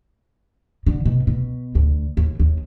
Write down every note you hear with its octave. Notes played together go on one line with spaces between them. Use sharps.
D3
B2
B2
D2
D#2
D#2